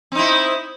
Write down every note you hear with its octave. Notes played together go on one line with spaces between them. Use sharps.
C4 D#4 E4